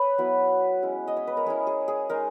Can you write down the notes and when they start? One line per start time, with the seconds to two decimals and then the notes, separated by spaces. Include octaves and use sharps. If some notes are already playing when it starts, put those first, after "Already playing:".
Already playing: B4 C#5
0.18 F#3 B3 E4
0.83 G#3 C#4 E4
1.08 D#5
1.17 C#5
1.27 B4
1.37 A#4
1.46 G#3 C#4 E4 G#4
1.67 G#4
1.88 G#4
2.10 G#3 D#4 A#4